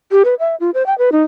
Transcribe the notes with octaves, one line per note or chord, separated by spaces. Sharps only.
G4
B4
E5
F4
C5
G5
B4
D#4